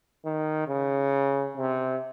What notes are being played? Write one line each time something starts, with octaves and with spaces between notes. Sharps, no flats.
D#3
C#3
C3